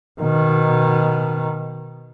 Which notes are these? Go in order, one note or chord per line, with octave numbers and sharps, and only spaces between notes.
B2 D#3